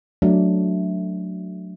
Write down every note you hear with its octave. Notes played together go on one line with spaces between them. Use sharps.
F#3 A3 D4